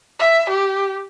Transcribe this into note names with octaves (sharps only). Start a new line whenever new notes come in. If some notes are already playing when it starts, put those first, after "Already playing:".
E5
G4